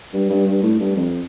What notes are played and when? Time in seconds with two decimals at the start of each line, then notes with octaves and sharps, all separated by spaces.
0.13 G2
0.29 G2
0.47 G2
0.63 A2
0.80 G2
0.96 F2